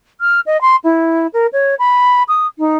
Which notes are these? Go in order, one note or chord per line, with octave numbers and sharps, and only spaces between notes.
F6
D#5
C6
E4
A#4
C#5
B5
D#6
D#4